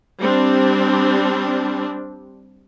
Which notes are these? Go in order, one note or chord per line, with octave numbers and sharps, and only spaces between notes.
G3 C4 D4